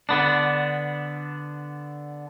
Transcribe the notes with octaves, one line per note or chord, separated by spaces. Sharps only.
D3 B3 D4